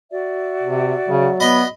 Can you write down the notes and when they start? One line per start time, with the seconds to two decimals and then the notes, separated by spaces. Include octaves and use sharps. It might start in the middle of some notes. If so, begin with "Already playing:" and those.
0.10 F#4 D5 E5
0.62 C3
1.08 C#3 F#3
1.40 B3 D#5 B5